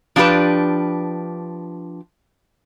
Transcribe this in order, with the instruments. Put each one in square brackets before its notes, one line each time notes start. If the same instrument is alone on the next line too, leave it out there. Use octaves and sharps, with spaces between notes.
[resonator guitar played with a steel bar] F3 D4 G4 B4